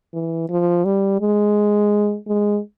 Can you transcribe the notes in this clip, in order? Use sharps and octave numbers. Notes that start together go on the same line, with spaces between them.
E3
F3
G3
G#3
G#3